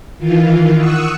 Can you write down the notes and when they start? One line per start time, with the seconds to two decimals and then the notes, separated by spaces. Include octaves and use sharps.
0.18 D#3 E3 F4
0.77 F#5 C#6 D#6 E6